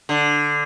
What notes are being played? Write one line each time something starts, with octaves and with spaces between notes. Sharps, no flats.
D3